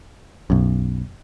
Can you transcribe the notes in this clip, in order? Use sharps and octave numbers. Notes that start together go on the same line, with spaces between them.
B1 F#2